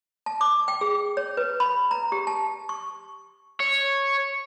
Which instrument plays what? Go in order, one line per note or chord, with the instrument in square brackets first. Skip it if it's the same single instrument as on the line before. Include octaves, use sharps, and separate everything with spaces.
[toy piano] A5
D6
G5
G#4
C#5
B4
B5
A#5
G4
A5
C#6
[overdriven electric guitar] C#5